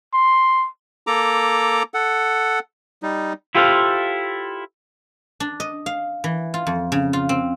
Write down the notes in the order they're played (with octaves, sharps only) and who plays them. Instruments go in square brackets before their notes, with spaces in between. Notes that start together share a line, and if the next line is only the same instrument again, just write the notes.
[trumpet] C6
[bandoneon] A#3 A4 A#5 D6
A4 F#5
G3 D#4
[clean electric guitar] E4 F4 G4 A4 C5 F5
[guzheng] D4
D#5
F5
E3
F4
F2
C#3
F4
C4